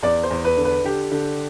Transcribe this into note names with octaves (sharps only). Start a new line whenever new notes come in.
E2 D5
C5
E2
B4
D3
B4
D3 G4
D3